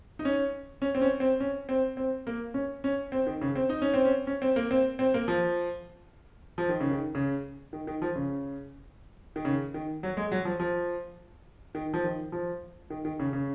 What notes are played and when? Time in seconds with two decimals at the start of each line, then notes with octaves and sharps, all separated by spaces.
0.19 D#4
0.25 C#4
0.82 C#4
0.95 C4
1.01 C#4
1.20 C4
1.40 C#4
1.69 C4
1.97 C4
2.27 A#3
2.54 C#4
2.84 C#4
3.12 C4
3.27 D#3
3.41 C#3
3.56 C4
3.69 D#4
3.82 C#4
3.94 C4
4.05 C#4
4.27 C#4
4.42 C4
4.56 A#3
4.71 C4
4.99 C4
5.14 A#3
5.28 F3
6.58 F3
6.69 D#3
6.80 C#3
6.91 D#3
7.15 C#3
7.73 D#3
7.87 D#3
8.02 F3
8.16 C#3
9.36 D#3
9.45 C#3
9.74 D#3
10.03 F#3
10.17 G#3
10.32 F#3
10.45 F3
10.60 F3
11.75 D#3
11.94 F3
12.04 D#3
12.32 F3
12.90 D#3
13.05 D#3
13.20 C#3
13.33 C#3